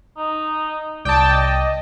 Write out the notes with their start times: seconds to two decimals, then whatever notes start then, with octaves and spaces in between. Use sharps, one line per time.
0.17 D#4
1.05 C2 D5 G5 A5 D#6
1.33 D#5